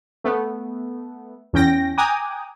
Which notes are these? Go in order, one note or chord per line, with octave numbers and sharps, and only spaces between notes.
A3 B3
E2 C#4 G5 A#6
G5 G#5 A#5 D6 D#6 F#6